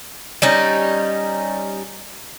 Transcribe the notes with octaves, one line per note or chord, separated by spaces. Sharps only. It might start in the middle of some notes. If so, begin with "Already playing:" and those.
G3 C#4 D#4